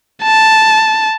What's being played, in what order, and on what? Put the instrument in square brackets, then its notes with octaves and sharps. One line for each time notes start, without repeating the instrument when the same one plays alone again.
[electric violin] A5